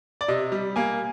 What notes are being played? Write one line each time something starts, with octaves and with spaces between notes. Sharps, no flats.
D5
C3 D#5
G3
A#3 G#5